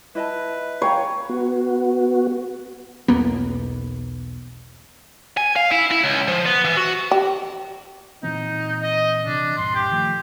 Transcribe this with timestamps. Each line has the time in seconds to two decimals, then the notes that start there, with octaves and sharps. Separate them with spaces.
0.15 E4 B4 D#5 A5
0.82 C#5 F5 G5 A#5
1.29 B3 F#4
3.08 B1 E2 A#3 B3
5.37 G#5
5.56 F5
5.71 E4
5.91 E4
6.04 C#2
6.28 F3
6.46 B3
6.65 E3
6.77 F#4
7.11 G4
8.23 A#2 E3 C4 D#4
8.83 D#5
9.26 C3 E3 D4
9.57 C2 G2 A#2 C6
9.75 G4
9.91 D#3 F3 A3